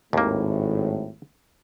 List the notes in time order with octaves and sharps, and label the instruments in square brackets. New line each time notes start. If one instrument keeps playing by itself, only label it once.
[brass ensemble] G#1 A2 [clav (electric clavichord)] D#2 A#3